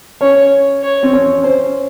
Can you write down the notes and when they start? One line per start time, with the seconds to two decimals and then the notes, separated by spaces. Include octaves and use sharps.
0.21 C#4 C#5
0.83 C#5
1.03 C4
1.13 C#4
1.44 C#4 C5